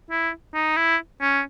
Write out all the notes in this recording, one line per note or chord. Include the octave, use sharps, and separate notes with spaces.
E4
D#4
E4
C#4